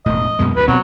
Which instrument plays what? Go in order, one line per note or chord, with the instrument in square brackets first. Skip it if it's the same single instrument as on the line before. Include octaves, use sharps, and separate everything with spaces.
[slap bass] E1 A2 [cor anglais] D#5
[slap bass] F#2 B2 G#3
[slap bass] D2 G2 [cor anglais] B4
[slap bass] B2 C4 [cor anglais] F#3